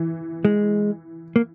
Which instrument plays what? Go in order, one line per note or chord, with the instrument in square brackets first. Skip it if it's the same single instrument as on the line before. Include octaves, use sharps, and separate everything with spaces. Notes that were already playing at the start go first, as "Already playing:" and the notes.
Already playing: [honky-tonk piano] E3
[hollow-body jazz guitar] G#3
A#3